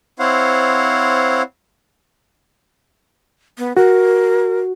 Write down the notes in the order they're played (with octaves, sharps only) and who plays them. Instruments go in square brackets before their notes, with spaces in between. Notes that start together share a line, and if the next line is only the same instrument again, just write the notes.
[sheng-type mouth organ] C4 E4 C5 C#5 F5 F#5
[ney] B3
[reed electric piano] F#4 [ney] A#4